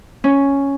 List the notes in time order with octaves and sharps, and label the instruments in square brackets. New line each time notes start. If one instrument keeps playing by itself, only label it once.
[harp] C#4